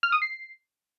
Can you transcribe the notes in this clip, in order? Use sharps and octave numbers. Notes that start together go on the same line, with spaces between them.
F6
D#6
C7